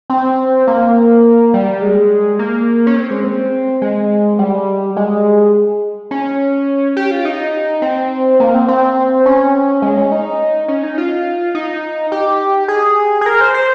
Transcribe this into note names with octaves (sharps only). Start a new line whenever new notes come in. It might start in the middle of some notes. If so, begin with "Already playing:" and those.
C4
A#3
G3
G#3
A#3
C#4
C4
G#3
C4
G#3
G3
G#3
C#4
G4
F4
D#4
C4
A#3
C4
C4
C#4
G#3
C#4
D#4
C#4
D#4
F4
D#4
G4
G#4
G#4
A#4
C5
C5